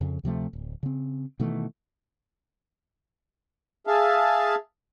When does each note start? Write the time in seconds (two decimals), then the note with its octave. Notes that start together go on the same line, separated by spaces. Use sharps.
0.01 F2 C#3
0.23 D2 C3 F3 A3
0.53 D1
0.83 C#3 C4
1.40 B2 D#3 E3 A3
3.87 G#4 E5 F5 A5